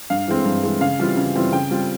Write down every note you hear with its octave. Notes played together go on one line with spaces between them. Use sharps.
G2 F5
E3 G#3 C4
G2
E3 G#3 C4
C#3 F5
E3 G3 C4 F4
C#3
E3 G3 C4 F4
C#3 G5
G3 C4 F4